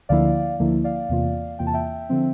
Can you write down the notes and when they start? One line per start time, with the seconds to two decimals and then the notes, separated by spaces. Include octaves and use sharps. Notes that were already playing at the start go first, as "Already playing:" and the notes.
0.09 D2 D3 F3 A#3 E4 D5 F5
0.59 D2 D3 F3 A#3 E4
0.84 D5 F5
1.09 E2 C3 E3 A#3 F4
1.59 E2 C3 E3 A#3 F4 G5
1.67 A5
1.74 E5 G5
2.09 D3 F3 C4